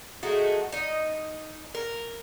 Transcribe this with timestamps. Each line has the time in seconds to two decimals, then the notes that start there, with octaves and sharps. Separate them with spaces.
0.23 G#3 A3 D#4 F#4
0.72 D#4 D#5
1.75 A#4